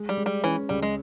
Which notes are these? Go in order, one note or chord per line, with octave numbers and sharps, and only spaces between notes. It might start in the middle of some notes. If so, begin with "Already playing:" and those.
Already playing: G#3
G3
G#3
G3
E3 C#4
C#2 G3
G#3